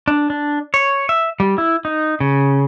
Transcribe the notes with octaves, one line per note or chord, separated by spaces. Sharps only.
D4
D4
C#5
E5
G3
E4
D#4
C#3